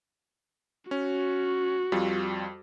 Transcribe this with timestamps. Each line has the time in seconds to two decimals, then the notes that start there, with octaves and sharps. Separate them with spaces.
0.91 C#4 F#4
1.92 F2 G3 F4